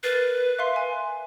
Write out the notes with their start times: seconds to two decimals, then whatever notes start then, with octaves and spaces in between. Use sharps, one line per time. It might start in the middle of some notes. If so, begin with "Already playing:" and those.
0.03 A#4 B4 A6 C7
0.59 E5 F5 C6
0.76 G#5